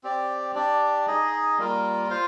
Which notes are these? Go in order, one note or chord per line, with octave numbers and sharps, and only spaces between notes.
C4 G4 D5
D4 G4 D5
D#4 G#4 D#5
G3 A#3 F4 A#4
F4 C5 F5